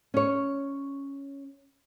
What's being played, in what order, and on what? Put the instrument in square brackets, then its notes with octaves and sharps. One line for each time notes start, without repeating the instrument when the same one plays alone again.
[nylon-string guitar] C#4 C#5